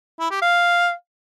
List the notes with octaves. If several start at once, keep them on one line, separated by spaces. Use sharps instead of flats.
E4
G4
F5